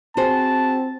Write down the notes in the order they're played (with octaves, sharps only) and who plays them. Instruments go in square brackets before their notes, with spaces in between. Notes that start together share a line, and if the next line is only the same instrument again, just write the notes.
[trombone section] C4 [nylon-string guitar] F#4 G#4 C5 [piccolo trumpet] A5